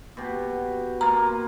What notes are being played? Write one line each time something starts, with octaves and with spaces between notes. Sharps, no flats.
B2 G4
A#3 F4 A#5